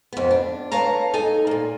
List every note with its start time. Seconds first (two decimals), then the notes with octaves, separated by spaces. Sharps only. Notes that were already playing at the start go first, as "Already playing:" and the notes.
0.13 F2 B3
0.31 D4
0.72 B4 C#5 F5 A5 A#5
1.14 D#4 A4 G#5
1.47 A#2 A#3